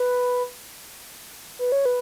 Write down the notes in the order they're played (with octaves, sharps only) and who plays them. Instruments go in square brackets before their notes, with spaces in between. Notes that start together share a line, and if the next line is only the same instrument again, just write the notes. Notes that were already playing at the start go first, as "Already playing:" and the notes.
Already playing: [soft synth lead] B4
B4
C#5
B4